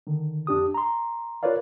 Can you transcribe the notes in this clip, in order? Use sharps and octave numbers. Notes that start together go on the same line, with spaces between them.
D3 D#3
F2 D4 G4 D#6
A#5 C6
F4 A#4 B4 C#5 D5 F5